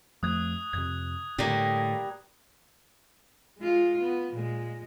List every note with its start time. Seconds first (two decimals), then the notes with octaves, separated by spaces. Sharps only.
0.23 F2 F3 A3 D#6 F#6 G#6
0.73 F2 C3 G#6
1.38 A2 D3 G3 A#3
3.58 G#3 F4
4.01 B3
4.34 A#2 G#3